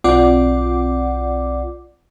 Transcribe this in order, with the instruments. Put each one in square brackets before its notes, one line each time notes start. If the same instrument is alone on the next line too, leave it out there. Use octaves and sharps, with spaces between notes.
[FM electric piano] B1 C4 F4 D5 F#5 D6